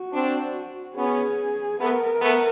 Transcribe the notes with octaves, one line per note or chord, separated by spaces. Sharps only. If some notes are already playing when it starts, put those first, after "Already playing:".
Already playing: F#4
C4 D4
B3 C#4 G#4
A3 B3 A#4
A3 B3